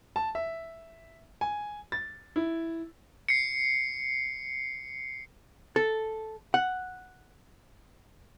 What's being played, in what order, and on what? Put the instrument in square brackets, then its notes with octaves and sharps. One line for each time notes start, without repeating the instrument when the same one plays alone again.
[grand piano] A5
E5
G#5
A6
E4
[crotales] C7 C#7
[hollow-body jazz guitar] A4
F#5